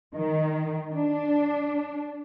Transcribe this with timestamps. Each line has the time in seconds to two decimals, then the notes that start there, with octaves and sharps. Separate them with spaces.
0.14 D#3
0.92 D4